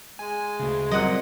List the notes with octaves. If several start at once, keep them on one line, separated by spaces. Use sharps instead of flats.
G#3 G#5
D2 C#3
A#2 F#3 G3 C4 D#5 F#5